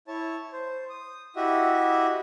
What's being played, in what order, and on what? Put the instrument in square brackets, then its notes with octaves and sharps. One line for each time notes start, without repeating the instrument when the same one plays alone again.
[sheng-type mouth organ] E4 C#5 A5
C5
D#6
E4 F#4 G4 D#5 E5